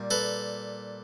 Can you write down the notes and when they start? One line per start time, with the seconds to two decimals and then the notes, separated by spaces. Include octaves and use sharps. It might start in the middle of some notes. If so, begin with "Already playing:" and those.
Already playing: A#2 G3
0.11 A4 B4